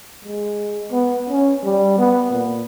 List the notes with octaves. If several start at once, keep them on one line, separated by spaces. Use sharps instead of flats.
G#3
B3
C#4
G3
B3
A#2